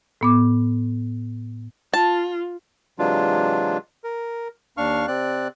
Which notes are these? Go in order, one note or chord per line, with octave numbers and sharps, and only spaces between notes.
A2 B3 D6
F4 A5
C3 E3 F#3 G#3 D4 F4
A#4
D#2 D4 F5 C#6 F6
C3 C4 D5 F#6